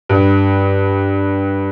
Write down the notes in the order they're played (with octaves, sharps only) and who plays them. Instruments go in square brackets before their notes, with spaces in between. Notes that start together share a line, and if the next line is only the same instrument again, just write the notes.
[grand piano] G2